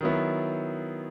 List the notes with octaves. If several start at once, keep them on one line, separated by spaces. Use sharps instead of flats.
D#3 F#3 B3 E4